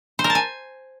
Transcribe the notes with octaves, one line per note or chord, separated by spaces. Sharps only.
C5
A#4
A5
G#5